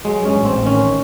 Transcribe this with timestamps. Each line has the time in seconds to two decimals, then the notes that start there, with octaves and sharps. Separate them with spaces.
0.05 F#3 G#3
0.21 G2 C#4
0.36 A1
0.45 C4
0.51 A1
0.66 D#3 C#4